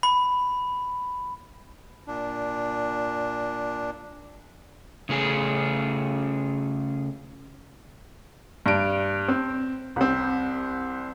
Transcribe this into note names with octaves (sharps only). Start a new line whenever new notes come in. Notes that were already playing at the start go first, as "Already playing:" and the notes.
B5
A#2 D4
C#3 A3 C#4 G#4
G2 D7
C4
C2 C4